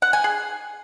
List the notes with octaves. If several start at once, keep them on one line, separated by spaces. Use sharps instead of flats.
F#5
G#5
G#4